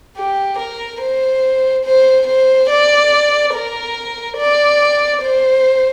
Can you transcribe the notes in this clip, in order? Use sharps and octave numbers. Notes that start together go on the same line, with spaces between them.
G4
A#4
C5
C5
C5
D5
A#4
D5
C5